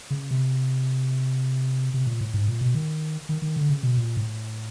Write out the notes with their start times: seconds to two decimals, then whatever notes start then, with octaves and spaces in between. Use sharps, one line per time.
0.10 C#3
0.31 C3
1.94 C3
2.07 A#2
2.21 A2
2.34 G#2
2.48 A#2
2.61 B2
2.75 D#3
3.29 D#3
3.42 D#3
3.56 D3
3.69 C#3
3.83 B2
3.97 A#2
4.17 A2